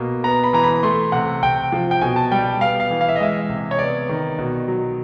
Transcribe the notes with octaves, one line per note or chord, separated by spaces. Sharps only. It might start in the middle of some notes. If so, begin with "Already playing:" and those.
Already playing: B2 A#3
B3 A#5
B5
E3 A#5
B5
A3 C6
C3 F#5
C3 G5
F3
G5
B2 G#5
A5
G3 G5
B3 F5
F5
E3
F5
E5
D#5
G#3 E5
C3
C#5
B3 D5
D#3
B2
F#3